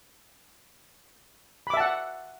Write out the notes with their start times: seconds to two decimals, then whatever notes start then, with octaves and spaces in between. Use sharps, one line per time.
1.67 B5
1.70 D6
1.74 E5
1.77 A5
1.80 F#5